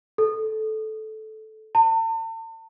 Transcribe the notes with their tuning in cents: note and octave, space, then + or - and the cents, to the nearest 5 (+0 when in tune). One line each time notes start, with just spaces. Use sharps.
A4 -15
A5 +40